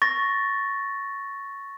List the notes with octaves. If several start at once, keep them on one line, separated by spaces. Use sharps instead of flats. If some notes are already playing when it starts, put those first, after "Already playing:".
C#6 A6 A#6